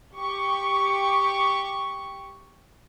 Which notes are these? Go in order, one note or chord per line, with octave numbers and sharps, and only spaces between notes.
G4 C#6